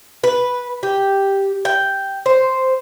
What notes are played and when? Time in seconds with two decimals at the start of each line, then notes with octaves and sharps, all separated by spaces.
0.23 B4
0.83 G4
1.65 G5
2.26 C5